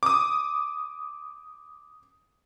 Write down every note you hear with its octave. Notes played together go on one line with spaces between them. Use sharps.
D6 D#6